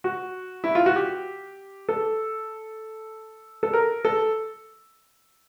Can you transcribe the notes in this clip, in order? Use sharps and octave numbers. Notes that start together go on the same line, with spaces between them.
F#4
E4
F4
F#4
G4
A4
A4
A#4
A4